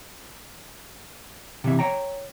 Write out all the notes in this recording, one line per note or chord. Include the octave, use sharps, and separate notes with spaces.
C3 E3 E5
C#5 G5 A#5